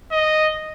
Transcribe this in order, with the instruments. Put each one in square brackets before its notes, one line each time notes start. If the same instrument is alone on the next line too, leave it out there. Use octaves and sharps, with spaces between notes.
[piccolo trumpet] D#5